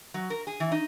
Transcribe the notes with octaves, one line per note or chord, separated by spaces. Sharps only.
F#3
A#4
G#4
E3
D#4